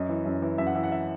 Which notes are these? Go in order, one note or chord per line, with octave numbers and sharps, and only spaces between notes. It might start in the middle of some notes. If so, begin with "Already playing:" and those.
Already playing: F#2 D#5
E3
F#2
E3
F#2 E5
F#5
E3 E5
F#5
E5